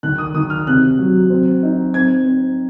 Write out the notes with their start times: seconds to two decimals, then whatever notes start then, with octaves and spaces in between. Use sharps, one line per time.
0.03 D#3 F#6
0.18 D#6
0.34 D#3 D#6
0.50 F6
0.67 C3 F#6
0.99 F#3
1.30 C4
1.63 D#4
1.94 C4 G#6
2.26 C4